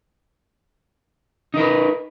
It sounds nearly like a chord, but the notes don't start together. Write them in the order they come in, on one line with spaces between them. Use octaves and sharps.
D#4 A#4 B4